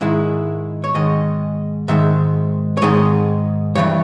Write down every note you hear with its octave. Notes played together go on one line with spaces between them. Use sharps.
G#2 D#3 G#3 E4
C#5
G#2 D#3 G#3 D#5
G#2 D#3 G#3 E5
C#5
G#2 D#3 G#3 D#5
G2 E3 G3 C#5